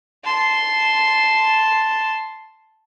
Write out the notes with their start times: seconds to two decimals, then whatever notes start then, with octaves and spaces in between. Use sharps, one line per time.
0.24 A5 C6